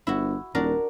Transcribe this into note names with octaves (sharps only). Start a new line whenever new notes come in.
G1 E4 F#4
D#1 D4 F#4 A#4